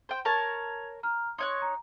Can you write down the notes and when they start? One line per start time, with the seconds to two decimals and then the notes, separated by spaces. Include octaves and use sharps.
0.09 C5 G5
0.25 A#4 C#5 A5 G#6 F7
1.03 A#5 F6
1.38 D#4 C#5 C6 F#6
1.62 A#5